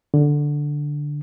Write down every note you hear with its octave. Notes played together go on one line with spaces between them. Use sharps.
D3